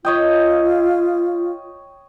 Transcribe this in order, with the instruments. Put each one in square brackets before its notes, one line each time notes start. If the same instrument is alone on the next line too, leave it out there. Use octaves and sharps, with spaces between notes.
[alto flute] F4 [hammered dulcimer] C#5 D#5 G5